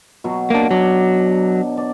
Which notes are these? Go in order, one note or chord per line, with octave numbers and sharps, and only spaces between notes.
B2 F#3
A#3 D4
F#3 D4
D5